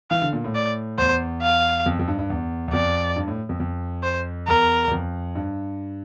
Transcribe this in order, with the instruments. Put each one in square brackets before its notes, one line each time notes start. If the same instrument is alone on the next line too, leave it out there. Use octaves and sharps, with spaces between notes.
[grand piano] E3 [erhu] F5
[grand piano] D3
A#2
A2
[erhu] D5
[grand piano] E2 [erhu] C5
[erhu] F5
[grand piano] F2
F2
G2
G2
E2
E2
[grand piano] F2 [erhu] D5
[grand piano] G2
A2
F2
F2
[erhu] C5
[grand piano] E2 [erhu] A#4
[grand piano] E2
F2
G2